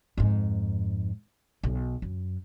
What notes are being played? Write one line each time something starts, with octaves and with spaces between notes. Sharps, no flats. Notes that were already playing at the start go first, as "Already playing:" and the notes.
F2 G#2
B1
F#2